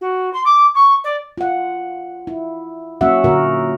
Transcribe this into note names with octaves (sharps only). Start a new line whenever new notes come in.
F#4
C6
D6
C#6
D5
F4 F#5
E4
F#3 A#3 C#4 F#4 E5 F#5
A#2 D3 A#3 F#4 A#4